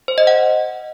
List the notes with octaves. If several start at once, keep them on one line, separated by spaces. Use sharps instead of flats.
C5
D#5
F#5